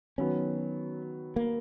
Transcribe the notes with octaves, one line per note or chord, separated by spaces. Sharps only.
D#3 F#3 B3 C#4
A#3